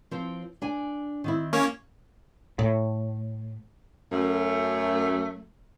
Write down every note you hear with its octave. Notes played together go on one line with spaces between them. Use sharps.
F3 C4 C5
D4 G#5
D#3 C4 E4
A#3 C#4 C#5
A2
F#2 A3